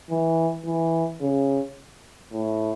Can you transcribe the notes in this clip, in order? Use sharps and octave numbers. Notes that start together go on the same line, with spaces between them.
E3
E3
C#3
A2